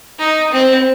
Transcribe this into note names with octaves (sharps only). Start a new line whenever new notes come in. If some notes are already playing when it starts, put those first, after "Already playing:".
D#4
C4